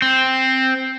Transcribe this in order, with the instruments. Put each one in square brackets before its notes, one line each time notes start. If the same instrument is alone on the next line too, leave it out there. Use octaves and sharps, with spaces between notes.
[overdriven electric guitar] C4